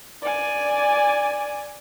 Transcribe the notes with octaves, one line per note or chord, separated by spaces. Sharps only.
D5 G#5